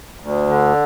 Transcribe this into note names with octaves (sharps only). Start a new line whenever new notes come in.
D2
D3